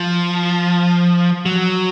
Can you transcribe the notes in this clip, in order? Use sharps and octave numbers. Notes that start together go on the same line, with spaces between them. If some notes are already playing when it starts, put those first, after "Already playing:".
Already playing: F3
F#3